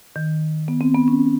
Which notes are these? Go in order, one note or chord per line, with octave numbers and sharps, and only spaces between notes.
D#3
B3
C4
B3
C#4